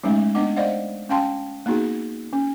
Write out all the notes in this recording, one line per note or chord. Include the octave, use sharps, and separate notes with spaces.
F#3 G#3 A3 C#4 D#4
B3 D4 D#5 F#5 D6
C5 D5 D#5 F5 F#5
C#4 F5 G5 A5 C6
A#3 B3 D#4 F#4 G#4
C#4